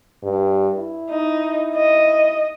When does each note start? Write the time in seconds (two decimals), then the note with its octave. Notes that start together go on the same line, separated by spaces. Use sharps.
0.23 G2
0.76 E4
1.10 D#4
1.75 D#5